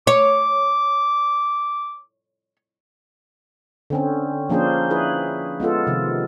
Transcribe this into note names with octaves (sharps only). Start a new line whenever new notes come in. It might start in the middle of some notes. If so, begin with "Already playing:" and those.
C#5 D6
D3 C4 C#4
F3 A#3 C#4 D4 G#4 C5
E4 G#4 B4
G#3 B3 F4 A4
C3 D#3 F3